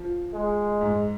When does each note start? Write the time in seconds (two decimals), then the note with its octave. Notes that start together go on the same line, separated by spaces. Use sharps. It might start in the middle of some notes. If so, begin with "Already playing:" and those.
Already playing: F3
0.33 G#3
0.81 G#2